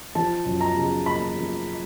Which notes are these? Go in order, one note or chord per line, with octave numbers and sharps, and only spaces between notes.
F3 A5
F#2
A#5
C#3
A#3 B5
F3